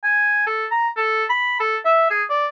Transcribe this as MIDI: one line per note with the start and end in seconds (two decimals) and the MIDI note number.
0.04 0.46 80
0.47 0.66 69
0.71 0.89 82
0.97 1.24 69
1.30 1.58 83
1.60 1.77 69
1.85 2.08 76
2.10 2.23 68
2.30 2.47 74